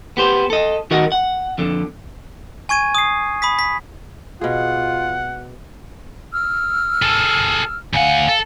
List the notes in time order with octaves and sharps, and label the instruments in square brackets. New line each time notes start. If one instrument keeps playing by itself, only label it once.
[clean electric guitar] B3 G4 C5
A4 D#5
D#3 F#4 A#4 D#5 F#5
F#5
F2 D3
[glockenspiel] G#5 C#6 G#6 D#7
D#6 C7
B5 D#6 B6
B6
[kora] B2 G#4 [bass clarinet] F4 [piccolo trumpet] F#5
[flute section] E6 F6
[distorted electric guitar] G#4 A4
[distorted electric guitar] D2 F#5 [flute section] F5 G#5
[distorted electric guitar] A4